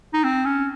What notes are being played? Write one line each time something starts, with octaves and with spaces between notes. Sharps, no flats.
D#4
C4
C#4